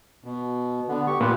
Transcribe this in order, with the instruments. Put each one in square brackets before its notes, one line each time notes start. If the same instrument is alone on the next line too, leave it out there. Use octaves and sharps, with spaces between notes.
[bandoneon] B2
D3 B3
G4 C#6
[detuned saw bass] A#2 [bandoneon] F4 G4 B4